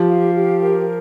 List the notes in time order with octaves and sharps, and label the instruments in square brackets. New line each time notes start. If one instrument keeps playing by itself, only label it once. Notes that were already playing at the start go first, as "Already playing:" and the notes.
Already playing: [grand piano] F3 [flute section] G4
[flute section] F5
G4
A#4